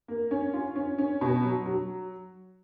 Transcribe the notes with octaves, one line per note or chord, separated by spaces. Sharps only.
A#3
C#4
F4
C#4
C#4
B2
F#3
F#3